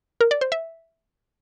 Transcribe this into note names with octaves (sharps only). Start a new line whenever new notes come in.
A#4
D5
C5
E5